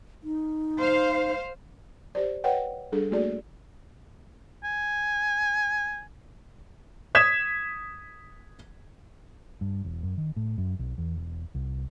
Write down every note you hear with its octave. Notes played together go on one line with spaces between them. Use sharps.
D#4
C5 F5
G4 C5 D5
B4 C#5 D#5 F#5 G5
G3 D4 G#4 A4
A3 A#3 F#4 G#4 D5
G#5
D#6 G#6 B6 E7
G2
E1
F#2
D#3
A2
F#2
B1
E2
E1
C2